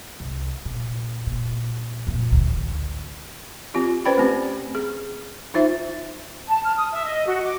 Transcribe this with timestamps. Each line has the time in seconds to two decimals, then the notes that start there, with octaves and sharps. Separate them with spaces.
0.20 C2
0.66 A#2
1.27 A#2
2.07 F2 A#2
2.32 A1 D2
3.74 C4 F4 G4
4.05 C#4 B4 C5 D5 G5 B5
4.18 A3 C4 G4
4.75 G#4
5.54 D#4 F4 C5 E5
6.48 A5
6.63 F6
6.77 D#6
6.93 E5
7.06 D#5
7.26 F#4
7.43 D6